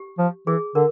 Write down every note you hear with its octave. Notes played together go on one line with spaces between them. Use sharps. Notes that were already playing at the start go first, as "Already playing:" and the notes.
Already playing: G4
F3
E3 G#4
D3 A#4